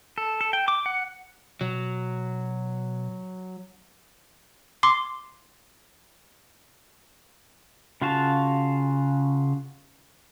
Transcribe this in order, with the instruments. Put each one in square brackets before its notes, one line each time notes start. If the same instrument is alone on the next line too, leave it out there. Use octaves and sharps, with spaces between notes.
[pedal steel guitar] A4
A4
G5
D6
F#5
[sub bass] B2 [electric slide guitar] F#3
[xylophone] C6 D6 C7
[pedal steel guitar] C#3 F4 F#4 F5 A5